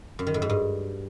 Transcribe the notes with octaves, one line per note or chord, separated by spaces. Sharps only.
F#2
D#3
A2
G#2
G2